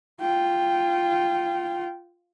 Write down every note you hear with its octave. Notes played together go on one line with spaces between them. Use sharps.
F4 G5